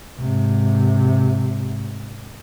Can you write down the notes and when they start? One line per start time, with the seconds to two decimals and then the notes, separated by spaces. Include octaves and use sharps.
0.19 G#2 C3